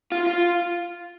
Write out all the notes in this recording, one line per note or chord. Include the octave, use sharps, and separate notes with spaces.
F4
F4